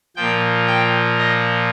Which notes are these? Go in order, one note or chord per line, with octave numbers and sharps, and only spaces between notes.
A#2 F3 G5
G5
D#5